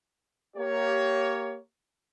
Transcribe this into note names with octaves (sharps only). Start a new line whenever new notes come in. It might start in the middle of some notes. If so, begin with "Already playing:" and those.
A#3 G4 C#5